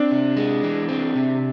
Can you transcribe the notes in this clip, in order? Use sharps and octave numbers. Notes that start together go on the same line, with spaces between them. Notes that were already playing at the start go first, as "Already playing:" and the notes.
Already playing: C4 D4
C3
G#3
E3
C4
C3